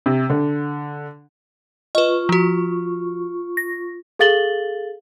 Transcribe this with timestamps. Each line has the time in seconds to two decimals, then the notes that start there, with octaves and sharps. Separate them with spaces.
0.06 C3
0.30 D3
1.95 F4 B4 D#5 C#6
2.29 F3 F#4
3.57 A#6
4.19 G#4 A4 F5 A6 F#7 G7